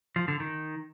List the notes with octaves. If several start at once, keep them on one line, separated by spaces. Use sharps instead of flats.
F3
D3
D#3